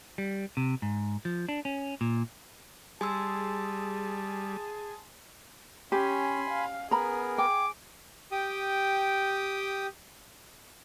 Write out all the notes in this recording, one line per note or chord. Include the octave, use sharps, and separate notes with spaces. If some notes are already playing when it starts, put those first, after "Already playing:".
G3
C3
G#2
F3
D4
C#4
A#2
G3 G#4 G#5 A5 C6 E6
C#4 G4 G#5 B5 C6
F5
B3 G#4 A#4 A#5 B5
G5 D6
G4 G5 D#6